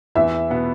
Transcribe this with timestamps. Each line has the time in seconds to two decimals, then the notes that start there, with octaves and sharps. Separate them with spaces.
0.15 E2 E5
0.50 B2 B3